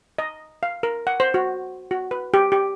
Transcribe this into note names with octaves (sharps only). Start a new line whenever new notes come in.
D#5
F5
A#4
F#5
C5
F#4
F#4
B4
G4
G4